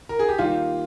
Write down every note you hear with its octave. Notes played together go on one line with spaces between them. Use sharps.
A#4
G#4
G4
D#3 G3 A#3 F4